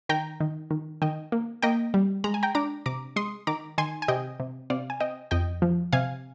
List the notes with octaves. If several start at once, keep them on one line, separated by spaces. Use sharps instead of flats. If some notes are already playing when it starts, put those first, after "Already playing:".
D#3 G5 A#5
D#3
D#3
D#3 D#5 G5
A#3
A#3 D#5 G5
G3
G#3 A#5
G#5
G5 A#5
D4 A#5 D6
C3 A#5 D6
G#3 C6 D#6
D#3 A#5 D6
D#3 G#5 C6
G#5
C3 D#5 G5
C3
C3 D5 F5
G#5
C4 D#5 G5
F2 D#5 G5
F3
C3 F5 G#5